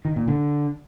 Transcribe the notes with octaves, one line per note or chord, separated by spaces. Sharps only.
D#3
A#2
D3